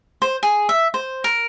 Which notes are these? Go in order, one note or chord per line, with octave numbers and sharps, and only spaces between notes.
C5
G#4
E5
C5
A#4